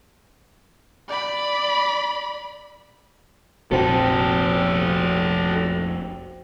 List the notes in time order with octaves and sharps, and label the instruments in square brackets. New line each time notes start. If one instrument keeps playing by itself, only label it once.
[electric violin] D5 B5
[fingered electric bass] F1 A#1 C3 [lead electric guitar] D#4 A4 [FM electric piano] F#4 C5 G5